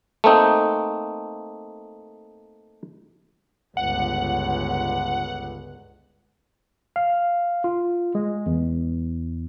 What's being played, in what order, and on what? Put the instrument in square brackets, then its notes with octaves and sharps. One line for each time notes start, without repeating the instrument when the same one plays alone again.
[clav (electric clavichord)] A3 A#3 C4 D#4
[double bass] G1 C#2 [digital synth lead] F#5
[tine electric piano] F5
F4
G#3
E2